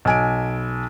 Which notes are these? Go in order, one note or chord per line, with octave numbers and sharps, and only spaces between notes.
B1 G#5 D7